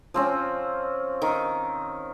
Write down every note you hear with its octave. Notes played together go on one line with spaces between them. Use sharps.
F3 C4 C#4
D#3